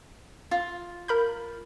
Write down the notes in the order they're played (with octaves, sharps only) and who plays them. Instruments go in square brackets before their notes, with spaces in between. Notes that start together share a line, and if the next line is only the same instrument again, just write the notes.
[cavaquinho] F4
[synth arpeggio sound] A#4 B5 G6